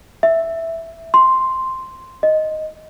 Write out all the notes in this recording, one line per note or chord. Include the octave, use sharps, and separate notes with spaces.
E5
C6
D#5